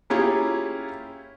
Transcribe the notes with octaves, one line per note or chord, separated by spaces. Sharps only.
A#3 C#4 E4 F4 G4 G#4